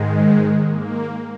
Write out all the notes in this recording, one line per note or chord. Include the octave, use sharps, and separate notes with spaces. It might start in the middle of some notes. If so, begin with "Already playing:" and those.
Already playing: G#2 D#3 G#3
A#3